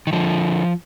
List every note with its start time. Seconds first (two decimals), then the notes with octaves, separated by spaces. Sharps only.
0.07 D#3
0.13 D3 F3